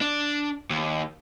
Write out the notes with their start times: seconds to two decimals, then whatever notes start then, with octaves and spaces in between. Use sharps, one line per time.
0.01 D4
0.70 D#2